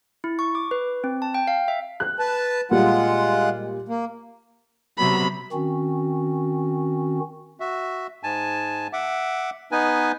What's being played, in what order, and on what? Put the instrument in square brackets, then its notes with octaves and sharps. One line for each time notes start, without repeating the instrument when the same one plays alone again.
[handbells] E4
C#6
D6
B4
C4
A5
G5
F5
E5
[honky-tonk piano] F#6
[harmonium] B4 A5
[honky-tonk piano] A#2 G3 [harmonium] G#3 F4 F#5
[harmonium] A#3
[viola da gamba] C3 F#3 B3 [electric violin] B5
[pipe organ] D#3 C4 C#4 F#4
[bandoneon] F#4 E5
G#2 G#5 A5
E5 F#5 D6
B3 D#4 B4 G#5